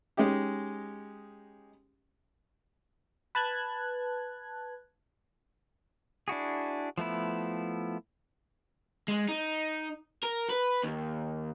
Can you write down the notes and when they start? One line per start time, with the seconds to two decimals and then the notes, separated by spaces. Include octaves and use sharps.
0.17 G#3 C#4 D#4 G4
3.35 B4 A5 F#6 G#6
6.28 D4 E4 F#4 G#4
6.98 F3 A3 B3 E4
9.08 G#3
9.28 D#4
10.24 A#4
10.50 B4
10.83 D#2